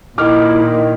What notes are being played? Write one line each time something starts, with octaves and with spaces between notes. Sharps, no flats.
A#2 D#3 E4 D6 F6